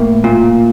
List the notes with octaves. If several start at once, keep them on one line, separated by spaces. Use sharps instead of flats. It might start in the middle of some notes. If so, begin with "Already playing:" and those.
Already playing: A2 A#3
A#2